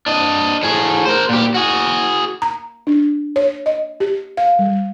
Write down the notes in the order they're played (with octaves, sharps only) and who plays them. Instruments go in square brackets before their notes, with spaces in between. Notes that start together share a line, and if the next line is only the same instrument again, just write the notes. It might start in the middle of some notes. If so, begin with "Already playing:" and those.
[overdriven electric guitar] D4 D#5
A2 G#4
A#4 C5
A#2 G4
F#4 G#4
[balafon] A#5
D4
C#5
D#5
G4
F5
G3